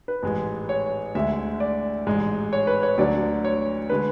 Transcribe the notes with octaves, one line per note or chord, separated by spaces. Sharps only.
B4
A1 G#2 G#3
C#5
D2 D3 G#3 E5
D5
A1 G#2 G#3
C#5
B4
C#5
D2 D3 F#3 D5
C#5
D3 G#3 B4